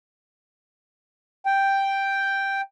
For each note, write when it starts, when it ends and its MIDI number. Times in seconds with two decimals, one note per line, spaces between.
1.46 2.61 79